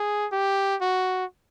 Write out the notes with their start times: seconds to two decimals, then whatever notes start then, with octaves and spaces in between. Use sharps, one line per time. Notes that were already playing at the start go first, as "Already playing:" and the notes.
Already playing: G#4
0.32 G4
0.81 F#4